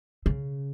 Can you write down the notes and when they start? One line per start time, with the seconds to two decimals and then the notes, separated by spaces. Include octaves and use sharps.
0.26 C#3